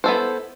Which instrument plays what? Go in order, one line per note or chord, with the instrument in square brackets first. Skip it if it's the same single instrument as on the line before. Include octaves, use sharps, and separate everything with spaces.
[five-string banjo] B3 E4 A4 C5